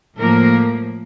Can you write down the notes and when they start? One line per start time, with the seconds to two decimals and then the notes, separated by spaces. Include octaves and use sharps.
0.17 A2 F3 A#3 A#4